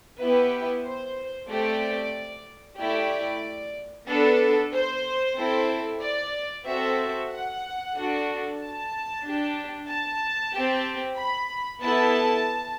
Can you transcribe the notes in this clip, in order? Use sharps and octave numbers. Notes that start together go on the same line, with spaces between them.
B3 E4 G4 B4
C5
A3 C4 G4 D5
A3 E4 G4 D5
B3 D4 A4 B4
C5
C4 E4 A4
D5
C4 F#4 A4 E5
F#5
D4 F#4 A4
A5
D4 G4
A5
C4 G4
B5
B3 E4 A4 A5